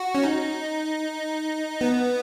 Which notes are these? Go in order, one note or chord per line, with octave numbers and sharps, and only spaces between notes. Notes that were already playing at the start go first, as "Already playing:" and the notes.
Already playing: F#4
C#4
D#4
B3